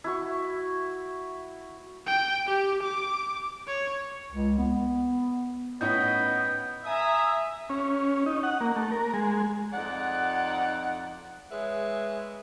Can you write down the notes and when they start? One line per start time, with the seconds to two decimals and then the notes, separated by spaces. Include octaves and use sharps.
0.04 E4 F#4 C#6
2.06 G5
2.46 G4
2.82 D6
3.67 C#5
4.32 C#2
4.59 B3
5.81 A2 B3 C#4 D#4 D#5 B5 G6
6.85 E5 G#5 A#5 D#6
7.69 C#4
8.26 D#4
8.43 F#5
8.61 A#3
8.76 A3
8.92 A#4
9.14 G#3
9.73 F2 D#4 D5 F#5
11.51 G#3 G#4 B4 C#5 E5